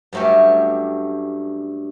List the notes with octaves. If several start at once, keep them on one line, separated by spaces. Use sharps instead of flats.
G2 F#3 A3 C#4 G4